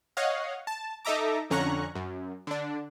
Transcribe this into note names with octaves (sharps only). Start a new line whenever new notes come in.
C#5 D#5 F5 F#5
A5
D#4 A4 D#5 E5 A#5 D6
F2 D3 C#4 A#5 C#6 F#6
F#2
D3 D4